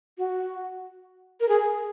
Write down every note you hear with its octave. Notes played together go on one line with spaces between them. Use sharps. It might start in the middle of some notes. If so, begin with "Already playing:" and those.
F#4
A#4
G#4